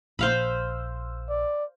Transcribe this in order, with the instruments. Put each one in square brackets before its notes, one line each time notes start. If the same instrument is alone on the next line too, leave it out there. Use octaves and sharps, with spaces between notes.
[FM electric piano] A#1 E6 [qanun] C5 F5 B5
[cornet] D5